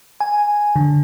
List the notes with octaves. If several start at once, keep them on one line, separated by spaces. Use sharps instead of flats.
G#5
D3